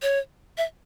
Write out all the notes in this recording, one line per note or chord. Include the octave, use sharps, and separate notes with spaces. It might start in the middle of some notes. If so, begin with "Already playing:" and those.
C#5
E5